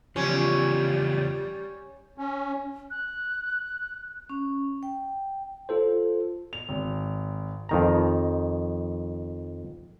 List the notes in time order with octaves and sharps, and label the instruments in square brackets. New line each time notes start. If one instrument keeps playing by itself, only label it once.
[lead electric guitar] E2 C#3 [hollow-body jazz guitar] F3 [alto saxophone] G3 [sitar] C#4
[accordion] C#4
[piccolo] F#6
[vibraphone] C#4
G5
[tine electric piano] F4 A4 C5
[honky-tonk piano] F7
G#1
[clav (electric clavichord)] F2 D#3 A#5